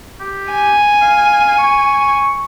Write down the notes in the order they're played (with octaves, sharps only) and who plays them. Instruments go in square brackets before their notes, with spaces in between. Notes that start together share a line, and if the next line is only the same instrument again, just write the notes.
[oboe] G4
[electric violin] G#5
[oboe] F5
C#6